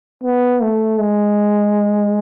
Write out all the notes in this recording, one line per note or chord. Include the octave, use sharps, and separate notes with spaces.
B3
A3
G#3